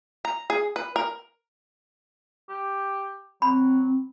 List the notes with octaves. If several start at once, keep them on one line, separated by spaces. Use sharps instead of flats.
A#5
G#4
B4
A#4
G4
F#3 C4 B5